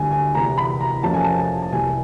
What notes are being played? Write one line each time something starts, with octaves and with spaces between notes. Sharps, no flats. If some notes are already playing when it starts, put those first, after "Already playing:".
Already playing: D2 D3 G3 G#5
G#5
E2 C3 E3 A#5
B5
A#5
F2 C3 F3 A#3 C#4 A5
G#5
A5
A5
A5
C2 C3 E3 G3 A#3 G#5